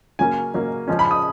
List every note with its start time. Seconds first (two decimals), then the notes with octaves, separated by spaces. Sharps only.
0.19 C#3 F#3 A#3 C#4 G#5
0.54 C#3 F#3 A#3 C#4
0.88 C#3 F3 G#3 C#4
0.99 B5
1.11 D#6